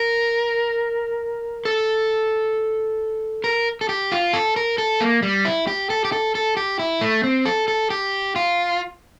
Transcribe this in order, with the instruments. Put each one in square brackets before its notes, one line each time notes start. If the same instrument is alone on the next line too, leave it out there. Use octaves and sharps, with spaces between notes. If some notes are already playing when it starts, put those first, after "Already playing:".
Already playing: [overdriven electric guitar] A#4
A4
A#4
A4
G4
F4
A4
A#4
A4
A#3
G3
E4
G4
A4
G4
A4
A4
G4
E4
A3
C4
A4
A4
G4
F4